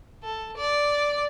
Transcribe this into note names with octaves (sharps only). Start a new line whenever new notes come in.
A4
D5